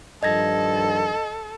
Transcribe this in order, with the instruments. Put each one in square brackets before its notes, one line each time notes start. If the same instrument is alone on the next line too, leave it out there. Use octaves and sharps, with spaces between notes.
[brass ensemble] G2 D#3 F3 [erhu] A4 [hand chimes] D#5 G#6 A#6